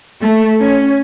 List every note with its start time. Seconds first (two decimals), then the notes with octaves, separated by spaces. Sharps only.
0.21 A3
0.59 C#4